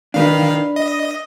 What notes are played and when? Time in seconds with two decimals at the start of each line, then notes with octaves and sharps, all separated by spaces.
0.14 D#3 D4 B4 F5
0.76 D#5